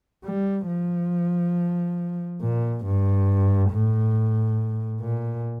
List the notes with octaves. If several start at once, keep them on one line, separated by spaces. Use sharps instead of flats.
G3
F3
A#2
G2
A2
A#2